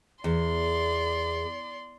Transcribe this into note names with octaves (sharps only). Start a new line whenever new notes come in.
E2 G#4 D5 C6